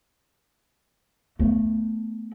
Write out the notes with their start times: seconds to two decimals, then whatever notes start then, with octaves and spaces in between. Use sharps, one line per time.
1.39 A3 B3